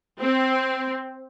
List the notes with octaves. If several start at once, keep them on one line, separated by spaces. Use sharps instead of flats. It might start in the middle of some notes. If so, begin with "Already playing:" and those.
C4